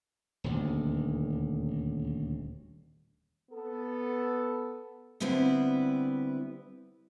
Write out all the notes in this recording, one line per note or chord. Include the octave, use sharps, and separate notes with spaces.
D#1 D2
B3 A4
D3 G3 B3 C4 E4